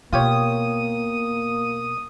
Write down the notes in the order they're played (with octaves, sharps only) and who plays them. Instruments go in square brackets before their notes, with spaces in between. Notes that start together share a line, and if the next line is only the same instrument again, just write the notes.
[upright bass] B2 [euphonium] A#3 [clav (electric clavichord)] F4 G4 C#5 [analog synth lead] D#6